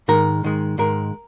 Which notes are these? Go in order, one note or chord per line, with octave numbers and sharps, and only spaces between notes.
G#2 D#3 G#3 A#4
G#2 D#3 G#3
G#2 D#3 G#3 A#4